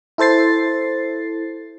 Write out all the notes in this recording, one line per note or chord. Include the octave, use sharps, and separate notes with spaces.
E4 A4 C5 A6 C7